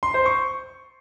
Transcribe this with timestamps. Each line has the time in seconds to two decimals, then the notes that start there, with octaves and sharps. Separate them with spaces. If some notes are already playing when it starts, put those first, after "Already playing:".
0.03 C6
0.14 C5
0.26 C#6